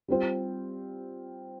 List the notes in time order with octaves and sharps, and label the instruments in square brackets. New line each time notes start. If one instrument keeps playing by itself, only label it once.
[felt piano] G3 C4 F4 C5